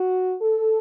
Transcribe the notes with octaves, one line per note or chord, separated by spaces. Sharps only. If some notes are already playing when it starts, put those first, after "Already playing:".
Already playing: F#4
A4